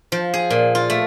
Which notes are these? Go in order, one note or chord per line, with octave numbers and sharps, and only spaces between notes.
F3
G#4
A#2
F4
A3